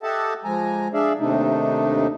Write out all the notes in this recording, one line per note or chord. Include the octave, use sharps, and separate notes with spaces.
G4 A4 D#5 E5 F#5 A5
F3 G#3 G#5 A#5
D4 G#4 D5 E5 F5
D#2 C3 A3 D4 D#4